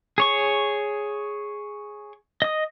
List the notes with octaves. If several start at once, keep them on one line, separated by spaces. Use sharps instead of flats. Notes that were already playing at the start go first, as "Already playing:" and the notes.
G#4 C#5 C#6
D#5 D#6